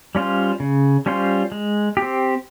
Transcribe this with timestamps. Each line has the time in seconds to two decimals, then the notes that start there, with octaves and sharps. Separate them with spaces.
0.15 G3 C#4 F4 C5
0.60 C#3
1.06 G3 C#4 F4 C5
1.52 G#3
1.97 G4
2.02 C4